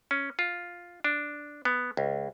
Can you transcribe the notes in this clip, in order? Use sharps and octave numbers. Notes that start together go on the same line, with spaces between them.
C#4
F4
D4
B3
C#2